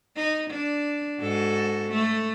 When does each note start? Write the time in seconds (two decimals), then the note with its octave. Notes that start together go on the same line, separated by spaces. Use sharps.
0.16 D#4
0.51 D4
1.19 G#2 F#4 A4
1.87 A3